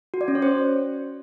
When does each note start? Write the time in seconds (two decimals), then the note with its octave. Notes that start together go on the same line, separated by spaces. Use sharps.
0.14 F#4
0.21 D5
0.28 C#4
0.35 C#5
0.42 C5